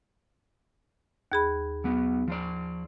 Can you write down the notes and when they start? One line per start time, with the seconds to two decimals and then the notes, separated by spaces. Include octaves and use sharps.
1.32 D#2 G#4 B5
1.84 F#3 B3
2.28 F3 C5 D5